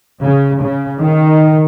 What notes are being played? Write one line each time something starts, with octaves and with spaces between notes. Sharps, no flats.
C#3
C#3
D#3